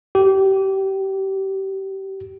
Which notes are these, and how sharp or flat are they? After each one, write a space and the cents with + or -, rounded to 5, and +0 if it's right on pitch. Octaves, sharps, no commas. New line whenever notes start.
G4 -25